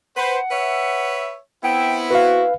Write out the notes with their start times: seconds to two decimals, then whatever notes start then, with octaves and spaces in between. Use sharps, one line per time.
0.17 B4 C5 F#5
0.51 B4 C#5 E5
1.64 B3 C4 E4 G5
2.11 F#4 B4 F5